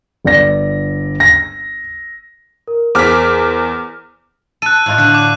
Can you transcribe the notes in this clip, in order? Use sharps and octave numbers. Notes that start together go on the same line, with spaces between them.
G1 D5 A#6
A#6
A#4
E2 A#4 C5 D6 F6 B6
A4 F#6 D#7
A2 F4 D#5
D3 D4
D6 F#6